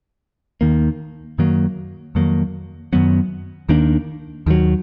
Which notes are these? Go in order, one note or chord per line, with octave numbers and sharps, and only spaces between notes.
D#2 D#3 A#3
F#2 D#3 F#3 A#3
F2 D#3 F#3 A#3
F#2 D#3 F#3 B3
D#2 D#3 A#3 D4
D#2 D#3 F#3